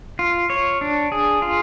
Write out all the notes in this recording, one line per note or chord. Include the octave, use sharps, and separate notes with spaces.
F4
C#5
D4
G#4
F4